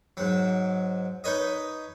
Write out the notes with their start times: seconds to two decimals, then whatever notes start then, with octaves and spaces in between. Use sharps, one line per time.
0.17 G#2 F#3
1.24 D#4 B4 C#5 D#5